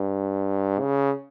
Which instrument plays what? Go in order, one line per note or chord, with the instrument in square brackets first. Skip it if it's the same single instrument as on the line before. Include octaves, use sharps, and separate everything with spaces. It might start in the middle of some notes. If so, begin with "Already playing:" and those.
Already playing: [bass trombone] G2
C#3